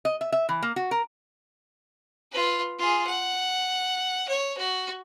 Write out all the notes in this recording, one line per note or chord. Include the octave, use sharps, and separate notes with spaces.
D#5
E5
E5
E3
A#3
F#4
A#4
F4 B4
F4 G#4
F#5
C#5
F#4